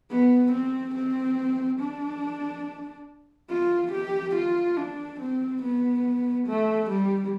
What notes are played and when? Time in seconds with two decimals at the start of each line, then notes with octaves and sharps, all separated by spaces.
0.10 B3
0.52 C4
0.94 C4
1.79 D4
3.50 F4
3.92 G4
4.35 F4
4.77 D4
5.20 C4
5.62 B3
6.47 A3
6.90 G3